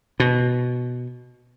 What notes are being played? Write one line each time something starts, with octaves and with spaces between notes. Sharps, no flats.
B2